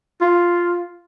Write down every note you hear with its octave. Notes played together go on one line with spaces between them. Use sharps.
F4